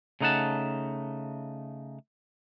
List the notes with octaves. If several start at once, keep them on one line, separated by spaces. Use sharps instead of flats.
C#3 A3 D#4 C5 F#5 A5